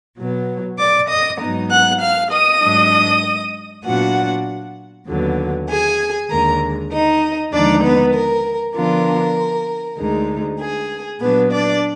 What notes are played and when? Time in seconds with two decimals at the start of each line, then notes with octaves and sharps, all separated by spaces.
0.17 B2 F#3 B3
0.78 D5 D6
1.09 D#5 D#6
1.40 G#2 F#3 B3 D#4
1.70 F#5 F#6
2.01 F5 F6
2.32 D#5 D#6
2.62 G#2 F#3 D4
3.85 A#2 F#3 B3 D4 F4 F#4 F#5
5.07 D#2 D3 F#3 B3
5.69 G#4 G#5
6.29 D#2 D3 G#3 A#4 A#5
6.92 D#4 D#5
7.53 D#2 D3 F3 G#3 D4 D#4 D5
7.83 B3 B4
8.14 A#4
8.75 D3 F3 B3 D4 F4 A#4
9.98 D2 D3 G#3 D#4
10.60 G#4
11.20 A#2 F#3 B3 D4 B4
11.51 D4 D5